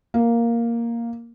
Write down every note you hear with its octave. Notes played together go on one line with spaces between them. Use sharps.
A#3